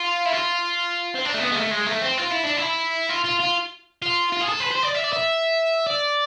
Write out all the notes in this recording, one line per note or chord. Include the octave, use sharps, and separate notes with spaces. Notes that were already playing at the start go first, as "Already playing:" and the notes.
Already playing: F4
E4
F4
C4
D4
A3
B3
G#3
A3
G#3
A3
C4
F4
E4
D4
E4
F4
F4
F4
F4
F4
G#4
A4
B4
C5
D5
E5
D5
E5
D5